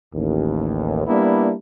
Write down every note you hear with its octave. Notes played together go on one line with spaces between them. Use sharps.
A1 D#2
G3 A#3 B3 D4 E4